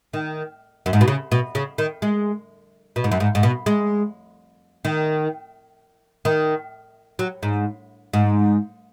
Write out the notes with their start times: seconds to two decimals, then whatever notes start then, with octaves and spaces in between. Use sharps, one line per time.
0.13 D#3
0.86 F#2
0.93 G#2
1.01 B2
1.08 C#3
1.32 B2
1.55 C#3
1.78 D#3
2.02 G#3
2.96 B2
3.04 G#2
3.11 F#2
3.20 G#2
3.35 G#2
3.43 B2
3.66 G#3
4.85 D#3
6.25 D#3
7.19 F#3
7.43 G#2
8.13 G#2